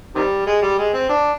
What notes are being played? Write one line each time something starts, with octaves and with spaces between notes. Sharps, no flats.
C3 D#3 G3
G#3
G3
G#3
C4
D4